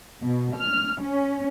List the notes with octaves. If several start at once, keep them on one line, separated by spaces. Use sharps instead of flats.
B2
F6
C#4